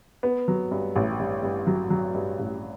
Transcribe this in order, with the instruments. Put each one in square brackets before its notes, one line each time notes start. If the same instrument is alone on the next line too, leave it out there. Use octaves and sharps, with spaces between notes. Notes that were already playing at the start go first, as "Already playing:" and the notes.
[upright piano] B3
F#3
G2
A1
G2
G2
F#3
F#3
G2
A1